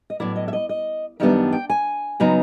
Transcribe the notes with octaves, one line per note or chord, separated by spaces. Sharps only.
D#5
A2 F#3 B3 E4 D5
D#5
E5
D#5
D#5
F#2 D#3 G3 B3 D4 E5
G5
G#5
C#3 F#3 B3 D#4